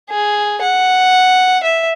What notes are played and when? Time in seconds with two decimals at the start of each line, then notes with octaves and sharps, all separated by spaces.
0.10 G#4
0.62 F#5
1.63 E5